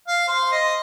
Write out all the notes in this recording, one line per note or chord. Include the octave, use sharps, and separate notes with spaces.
F5
C5
D#5